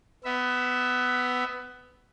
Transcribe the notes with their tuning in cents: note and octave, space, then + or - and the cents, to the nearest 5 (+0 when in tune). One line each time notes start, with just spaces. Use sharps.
B3 +15 E5 -5